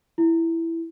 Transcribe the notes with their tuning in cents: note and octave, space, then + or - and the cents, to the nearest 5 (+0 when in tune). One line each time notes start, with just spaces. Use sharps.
E4 +5